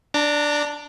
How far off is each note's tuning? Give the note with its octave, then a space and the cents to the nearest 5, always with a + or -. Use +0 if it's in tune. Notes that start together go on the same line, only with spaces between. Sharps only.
D4 +0 A#5 -35 D6 +0